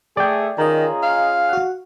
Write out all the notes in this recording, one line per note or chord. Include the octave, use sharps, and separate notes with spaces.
A3 G#4 D5 G5
D#3 C#4 F4 G#4 D#5 A#5
F5
F#4 F#5